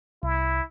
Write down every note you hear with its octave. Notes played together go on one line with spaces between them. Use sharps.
C2 E4